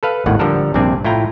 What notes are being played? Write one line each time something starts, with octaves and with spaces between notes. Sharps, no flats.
A4 B4 F5
G#1 D#2 A2 F#5
D3 F3 G3 A4 A#4
A#1 G2 C3 C4 D5 G#5
A2 E4 F4 G5 A#5